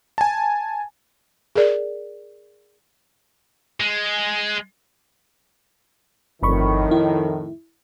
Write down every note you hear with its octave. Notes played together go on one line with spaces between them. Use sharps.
G#5 A5
G#4 A#4 D5
G#3
G1 F2 A2 D#3 B5 C#6
E4